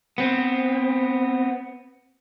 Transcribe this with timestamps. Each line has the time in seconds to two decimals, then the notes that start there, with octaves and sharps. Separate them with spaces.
0.18 B3 C4